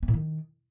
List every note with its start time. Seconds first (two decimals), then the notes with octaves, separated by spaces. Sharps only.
0.03 B3
0.08 A2
0.14 D#3